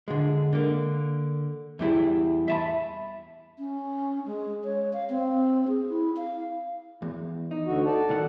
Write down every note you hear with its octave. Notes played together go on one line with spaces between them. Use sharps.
D3 G#3
D3 A#3
E2 G3 E4 G#4
E5 A5 B5
C#4
G#3
C#5
F5
C4
G#4
E4
F5
E2
D#4
D2 D3 F#4
A4 D5 A5
B1 D#3 F#5